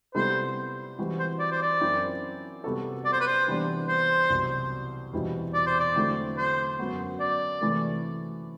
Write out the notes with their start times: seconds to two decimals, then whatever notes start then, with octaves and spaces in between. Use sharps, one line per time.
0.15 C3 G3 B3 E4 A4 C5
0.99 E3 G3 C4 F#4
1.19 C5
1.39 D5
1.51 C5
1.62 D5
1.81 F#2 F#3 C4 E4
2.64 C3 G3 B3 F#4 A4
3.05 D5
3.12 C5
3.20 B4
3.27 C5
3.48 C3 E3 G3 B3 D4
3.88 C5
4.30 C2 B2 F#3
5.13 E2 B2 G3 C4 E4
5.54 D5
5.66 C5
5.80 D5
5.96 D3 F#3 A3 C4 E4
6.37 C5
6.79 F#2 F#3 B3 F#4
7.20 D5
7.61 C3 E3 A3